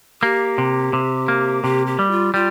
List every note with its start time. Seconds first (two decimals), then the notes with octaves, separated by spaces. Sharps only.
0.22 A#3 G4
0.58 C3
0.93 C3
1.28 A#3
1.63 C3 G4
1.87 G4
1.99 G3
2.11 F4
2.34 G3 F4